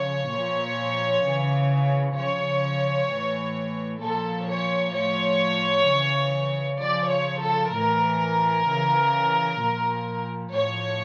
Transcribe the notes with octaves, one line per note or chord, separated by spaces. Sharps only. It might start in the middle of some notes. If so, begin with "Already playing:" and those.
Already playing: C#3 F3 C#5
A#2 F3
C#3 E3
C#3 F3 C#5
A2 E3
A#2 F3 A4
C#5
A2 F3 C#5
C#3 E3
C#3 F3 D5
C#5
A4
A2 E3 A#4
C#3 E3
A#2 F3
A2 F3 C#5